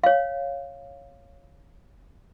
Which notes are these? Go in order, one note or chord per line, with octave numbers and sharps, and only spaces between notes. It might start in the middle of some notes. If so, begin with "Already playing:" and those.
C#5 F5